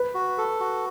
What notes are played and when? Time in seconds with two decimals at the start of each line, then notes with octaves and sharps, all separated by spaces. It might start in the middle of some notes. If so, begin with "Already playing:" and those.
Already playing: B4
0.14 F#4
0.38 A4
0.60 F#4